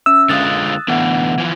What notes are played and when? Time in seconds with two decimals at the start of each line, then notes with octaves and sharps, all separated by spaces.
0.06 C#4 E5 E6
0.29 D3 G#3 F4 D#6 F#6 A6
0.88 D3 E3 A3 B3 F#5
1.38 E3 F3